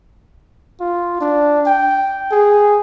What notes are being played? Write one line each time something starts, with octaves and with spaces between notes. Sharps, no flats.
F4
D4
G5
G#4